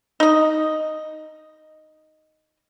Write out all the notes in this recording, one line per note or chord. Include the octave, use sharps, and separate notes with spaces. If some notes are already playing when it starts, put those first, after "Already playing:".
D#4 D#5